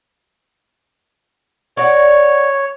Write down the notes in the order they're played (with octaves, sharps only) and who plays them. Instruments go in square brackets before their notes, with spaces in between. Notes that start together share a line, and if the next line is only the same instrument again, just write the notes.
[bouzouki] F#4 D5 [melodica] C#5